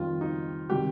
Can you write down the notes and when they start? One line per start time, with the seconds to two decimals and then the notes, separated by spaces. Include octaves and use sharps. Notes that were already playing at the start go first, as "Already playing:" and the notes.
Already playing: F2 D#3 G3 F4
0.21 D#4
0.70 C3 D#3 G3 G4